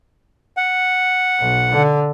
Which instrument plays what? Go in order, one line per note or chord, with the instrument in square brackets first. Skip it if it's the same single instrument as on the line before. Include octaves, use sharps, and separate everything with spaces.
[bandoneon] F#5
[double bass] B1
D3